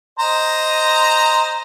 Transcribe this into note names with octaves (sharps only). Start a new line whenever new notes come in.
C5 D#5 A#5